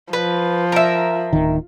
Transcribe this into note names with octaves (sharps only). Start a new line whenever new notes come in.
F3 B4
A#4 E5
D1 D#3